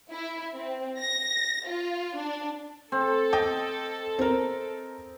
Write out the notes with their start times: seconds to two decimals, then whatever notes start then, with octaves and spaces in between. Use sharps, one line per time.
0.11 E4
0.56 C4
1.00 A#6
1.68 F4
2.17 D4
2.92 C4 A4
3.33 D#5 G5
4.19 C4 A#4